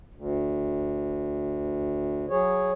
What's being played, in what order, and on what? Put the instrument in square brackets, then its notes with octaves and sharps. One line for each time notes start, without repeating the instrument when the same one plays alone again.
[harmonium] D2
F#3 G#4 C#5